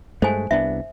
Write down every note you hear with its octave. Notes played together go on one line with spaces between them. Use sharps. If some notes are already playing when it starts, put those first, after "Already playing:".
G2 G#3 A3 C5 G#5
C2 B3 D4 E5